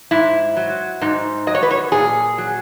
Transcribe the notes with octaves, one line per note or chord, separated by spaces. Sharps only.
G#2 E4
F#3
G#2 D#4
F#3 D#5
C#5
B4
C#5
A#2 G#4
F#3